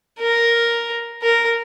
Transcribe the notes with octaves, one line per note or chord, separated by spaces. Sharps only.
A#4
A#4